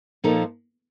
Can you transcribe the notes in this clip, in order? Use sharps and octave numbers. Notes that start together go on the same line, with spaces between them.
A#2 F3 A#3 D#4 A4